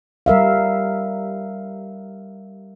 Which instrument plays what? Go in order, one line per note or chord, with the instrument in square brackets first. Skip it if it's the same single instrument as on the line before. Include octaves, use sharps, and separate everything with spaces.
[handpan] G3 A#4 E5 F5